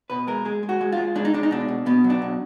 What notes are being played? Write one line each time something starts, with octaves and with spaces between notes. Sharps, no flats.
B2 B4
G#3 A#4
G#3 G#4
G#3
F#4
G#3
F4
G#3
G#3 D4
D#4
G#3 D4
D#4
B2 D4
B2
B2 B3
F#3
D4
B2